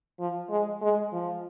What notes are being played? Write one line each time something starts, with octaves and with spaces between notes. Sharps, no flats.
F3
G#3
G#3
F3